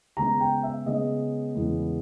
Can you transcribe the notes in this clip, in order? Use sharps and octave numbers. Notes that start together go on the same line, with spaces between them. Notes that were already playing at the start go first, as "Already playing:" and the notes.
C#3 G#3 B3 A#5
G5
E5
C#3 G#3 B3 D#5
E2 C#3 G#3 B3 E4